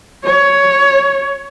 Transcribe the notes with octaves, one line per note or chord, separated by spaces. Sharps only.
C#5